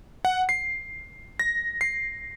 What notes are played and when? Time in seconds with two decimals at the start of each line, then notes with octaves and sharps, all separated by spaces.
0.25 F#5
0.49 C7
1.39 A#6
1.81 C7